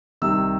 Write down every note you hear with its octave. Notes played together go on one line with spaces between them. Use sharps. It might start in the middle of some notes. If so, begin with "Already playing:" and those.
C2 C3 D#3 E6